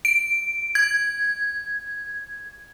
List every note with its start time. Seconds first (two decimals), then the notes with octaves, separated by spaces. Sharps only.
0.05 D7
0.75 G#6